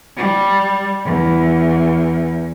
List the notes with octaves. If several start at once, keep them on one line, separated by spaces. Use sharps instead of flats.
G3
E2